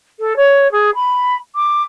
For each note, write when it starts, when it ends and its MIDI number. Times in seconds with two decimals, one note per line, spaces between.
0.19 0.33 69
0.36 0.70 73
0.71 0.90 68
0.95 1.35 83
1.55 1.83 86